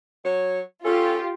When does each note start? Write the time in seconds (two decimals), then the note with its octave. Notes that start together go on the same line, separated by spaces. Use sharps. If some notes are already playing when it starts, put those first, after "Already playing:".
0.24 F#3 C#5
0.84 C#4 F4 G4 A4